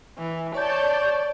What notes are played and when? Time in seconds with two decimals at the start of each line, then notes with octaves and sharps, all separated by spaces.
0.18 E3
0.55 C#5 D5 A5 G6